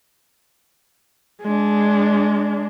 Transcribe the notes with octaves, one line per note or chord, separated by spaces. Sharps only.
G#3 D4